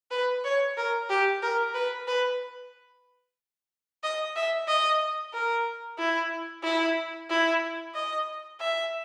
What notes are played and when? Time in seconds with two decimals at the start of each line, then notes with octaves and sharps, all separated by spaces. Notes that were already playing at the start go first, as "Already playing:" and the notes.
0.11 B4
0.44 C#5
0.77 A#4
1.10 G4
1.43 A#4
1.74 B4
2.07 B4
4.04 D#5
4.36 E5
4.68 D#5
5.33 A#4
5.98 E4
6.64 E4
7.30 E4
7.95 D#5
8.60 E5